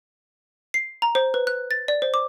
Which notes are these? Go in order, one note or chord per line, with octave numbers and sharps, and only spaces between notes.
C7
A#5
C5
B4
F#6
A6
D5
C5
D6